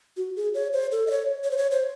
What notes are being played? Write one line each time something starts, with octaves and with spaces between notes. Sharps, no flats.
F#4
G#4
C#5
C5
A4
D#5
C#5
C#5
C5
C#5
C5